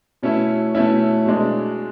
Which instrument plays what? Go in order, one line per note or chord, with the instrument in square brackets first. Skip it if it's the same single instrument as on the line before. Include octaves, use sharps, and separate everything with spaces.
[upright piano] B2 A3 C#4 E4
B2 A3 C#4 E4
B2 G#3 D4